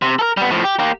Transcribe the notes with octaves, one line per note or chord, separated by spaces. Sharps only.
C3
A4 A#4
G3 B3
A2 F3
G4
A#3 G4